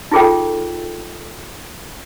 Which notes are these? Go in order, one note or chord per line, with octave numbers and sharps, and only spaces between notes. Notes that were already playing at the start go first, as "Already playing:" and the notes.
D#4 F4 G#4 A4 G5